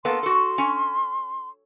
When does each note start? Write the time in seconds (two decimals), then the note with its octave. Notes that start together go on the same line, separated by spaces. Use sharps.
0.05 A#3 B3 A4 C6
0.23 F#4 A4
0.58 C#4